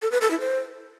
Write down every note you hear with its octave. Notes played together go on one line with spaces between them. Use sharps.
A4
B4
A4
E4
C5